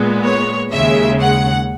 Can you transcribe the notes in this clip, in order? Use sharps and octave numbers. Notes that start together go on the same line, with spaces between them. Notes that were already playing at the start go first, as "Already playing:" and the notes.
Already playing: A#2 G#3 B3
C#5
D#2 C#3 G#3 E5
F#5